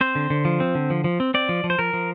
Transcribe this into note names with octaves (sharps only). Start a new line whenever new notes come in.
C4 C5
D3
D3
F3
C4
D3
F3
F3
C4
C4 D5
F3
F3
C5
F3 A#4
F3